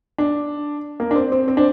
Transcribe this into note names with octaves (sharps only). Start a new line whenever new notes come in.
D4
A#3
D4
C4
C4
C4
D4